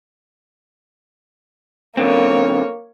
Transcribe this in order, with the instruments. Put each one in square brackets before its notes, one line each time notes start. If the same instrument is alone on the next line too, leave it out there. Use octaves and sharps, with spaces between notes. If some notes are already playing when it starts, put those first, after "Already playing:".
[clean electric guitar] F#2 D3 C4 [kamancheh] A#3 C#5